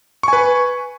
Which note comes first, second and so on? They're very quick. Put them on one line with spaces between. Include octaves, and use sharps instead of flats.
C#6 G#5 B4